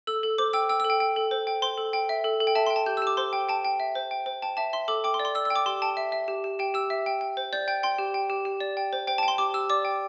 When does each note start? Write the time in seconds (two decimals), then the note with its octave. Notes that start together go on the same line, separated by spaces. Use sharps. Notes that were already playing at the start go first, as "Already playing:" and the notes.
0.07 A4 E6
0.23 A4
0.38 C5 D6
0.53 G5 E6
0.69 G5 E6
0.80 E6
0.85 A4
0.90 G5
1.00 G5
1.16 A4
1.31 C5
1.47 G5
1.62 C5 C6
1.78 A4
1.93 G5
2.09 E5
2.24 A4
2.40 A4
2.47 G5
2.55 E5 A5
2.66 C6
2.70 G5
2.76 A5
2.86 G4 G6
2.97 E6
3.02 G4 D6
3.17 C5 C6
3.33 G5
3.49 G5 A5
3.65 G5
3.80 E5
3.95 C5
4.11 G5
4.26 C5
4.42 G5 A5
4.57 E5 A5
4.73 E5 C6
4.88 A4 D6
5.04 G5 D6
5.14 C6
5.20 D5
5.25 C6
5.35 D5 E6
5.45 E6
5.50 G5
5.56 D6
5.66 G4 C6
5.82 G5 A5
5.97 E5
6.12 E5
6.28 G4
6.44 G4
6.59 G4 G5
6.74 G4 E6
6.90 E5
7.06 G5
7.21 G5
7.37 C5
7.53 D5 G6
7.68 G5 G6
7.83 G5 C6
7.98 G4
8.14 G5
8.30 G4
8.45 G4
8.60 D5
8.77 G5
8.93 C5
9.07 C5 G5
9.18 A5
9.23 G5
9.28 C6
9.38 G4 D6
9.54 G4 E6
9.70 D5 D6
9.85 G5